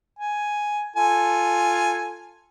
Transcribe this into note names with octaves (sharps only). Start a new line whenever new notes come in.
G#5
F4 A4 G#5